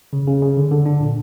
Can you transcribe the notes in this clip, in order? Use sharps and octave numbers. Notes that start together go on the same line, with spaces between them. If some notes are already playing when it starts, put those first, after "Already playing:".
C#3
C#3
C#3
D3
D3
D4
A#2